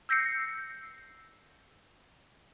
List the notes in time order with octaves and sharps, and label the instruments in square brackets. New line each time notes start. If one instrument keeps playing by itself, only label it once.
[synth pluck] E6 G6 A#6 C7 C#7